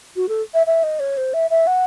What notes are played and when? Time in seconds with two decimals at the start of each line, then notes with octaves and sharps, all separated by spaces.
0.16 F#4
0.29 A4
0.54 E5
0.67 E5
0.83 D#5
1.00 C#5
1.17 C5
1.34 E5
1.50 E5
1.67 F#5